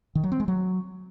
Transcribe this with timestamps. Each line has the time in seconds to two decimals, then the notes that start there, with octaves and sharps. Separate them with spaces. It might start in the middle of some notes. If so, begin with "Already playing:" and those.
0.15 D#3
0.24 F#3
0.32 C4
0.40 G#3
0.48 F#3